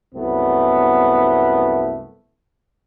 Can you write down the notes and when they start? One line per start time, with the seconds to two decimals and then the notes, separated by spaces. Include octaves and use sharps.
0.14 C2 F#2 A3 B3